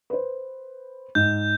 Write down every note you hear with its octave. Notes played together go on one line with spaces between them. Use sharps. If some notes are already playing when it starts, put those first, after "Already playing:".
B4 C5
G#2 G6